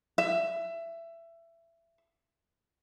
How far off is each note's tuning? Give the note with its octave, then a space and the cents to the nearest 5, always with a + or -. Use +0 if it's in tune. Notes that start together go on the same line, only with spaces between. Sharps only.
E5 +20